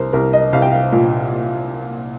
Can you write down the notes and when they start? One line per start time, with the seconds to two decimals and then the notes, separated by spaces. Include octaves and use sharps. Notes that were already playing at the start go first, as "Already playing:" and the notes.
Already playing: C2 A#4 C5
0.13 C2 A#4
0.33 D#5
0.53 C2 F5
0.62 G5
0.71 F5
0.92 A#2